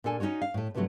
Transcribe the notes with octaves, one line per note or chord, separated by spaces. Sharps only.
A#2 D4 A4 G#5
C#4 D#4 F4 F#4 C#5
F5
A2 A3
G2 C3 F3 F#3 A3